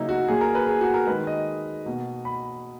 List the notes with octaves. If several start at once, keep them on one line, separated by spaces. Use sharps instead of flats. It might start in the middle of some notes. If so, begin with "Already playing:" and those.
Already playing: C#3 F#3 A#3 D#4 E4
F#4
A#2 F#3 A#3 G#4
A#4
B4
G#4
F#4
A#4
D#3 G#3 B4
D#5
B2 A#3
B5